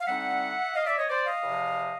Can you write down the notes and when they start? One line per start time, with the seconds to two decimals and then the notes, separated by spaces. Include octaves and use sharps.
0.01 F5
0.06 D3 G3 C4 D#4 E5 F#5
0.75 D#5 F5
0.86 D5 E5
0.97 C#5 D#5
1.09 C5 D5
1.25 D#5 F5
1.42 E2 C3 F3